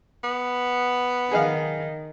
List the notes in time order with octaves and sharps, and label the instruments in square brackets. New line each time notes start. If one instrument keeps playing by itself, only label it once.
[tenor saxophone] B3
[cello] D#3 [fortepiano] G#4 D#5 F5